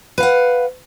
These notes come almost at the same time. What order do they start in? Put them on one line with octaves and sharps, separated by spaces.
B4 F5 F#5